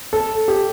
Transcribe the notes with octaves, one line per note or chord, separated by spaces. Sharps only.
A4
G4